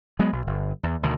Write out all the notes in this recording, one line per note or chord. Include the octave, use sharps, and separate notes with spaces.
F#3 G#3 B3
B1
G1
E2
D2 B2 D#3